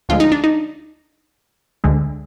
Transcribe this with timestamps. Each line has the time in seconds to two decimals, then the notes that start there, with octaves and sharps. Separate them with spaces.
0.09 D2 D3 F3 G#3 F4
0.20 D#4
0.32 D4
0.44 D#4
1.84 D2 D3 G#3